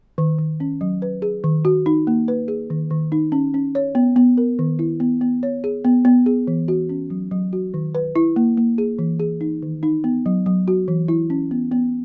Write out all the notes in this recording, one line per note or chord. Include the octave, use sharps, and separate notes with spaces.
D#3
D#3
C#4
F#3
B4
G#4
D#3
F#4
D#4
A#3
B4
G#4
D#3
D#3
D#4
C#4
C#4
C#5
B3
B3
A#4
D#3
E4
B3
B3
C#5
G#4
B3
B3
G#4
E3
F#4
C#4
F#3
F#3
F#4
D#3
B4
E4
A#3
A#3
G#4
E3
G#4
D#4
D#3
D#4
B3
F#3
F#3
F#4
E3
E4
C#4
B3
B3